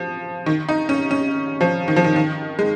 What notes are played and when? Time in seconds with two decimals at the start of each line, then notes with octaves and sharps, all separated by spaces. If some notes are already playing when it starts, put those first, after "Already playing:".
Already playing: F3
0.46 D#3
0.69 D#4
0.89 C#4
1.11 C#4
1.61 F3
1.88 D#3
1.96 F3
2.04 D#3
2.16 D#3
2.59 G#3